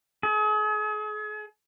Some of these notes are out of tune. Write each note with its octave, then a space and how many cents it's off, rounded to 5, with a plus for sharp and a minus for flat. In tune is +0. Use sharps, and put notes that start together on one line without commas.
G#4 +40